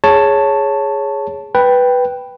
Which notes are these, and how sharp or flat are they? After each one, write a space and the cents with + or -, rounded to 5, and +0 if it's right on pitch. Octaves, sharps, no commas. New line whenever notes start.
G#4 +0 C#5 +0 A5 +5
B4 +0 G5 +0